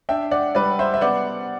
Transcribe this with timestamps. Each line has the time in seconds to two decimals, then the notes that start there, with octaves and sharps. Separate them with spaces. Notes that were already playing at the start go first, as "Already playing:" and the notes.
0.09 D4 E5 G5
0.31 D5 F#5
0.55 G3 B4 D5
0.79 C5 E5
0.94 E5
1.01 B3 D5 F#5